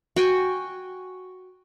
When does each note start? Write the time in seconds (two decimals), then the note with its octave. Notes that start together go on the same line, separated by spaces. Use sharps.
0.16 F#4 G5 G#5